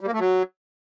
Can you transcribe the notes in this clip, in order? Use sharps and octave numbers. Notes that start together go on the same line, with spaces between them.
G3
A#3
A3
F#3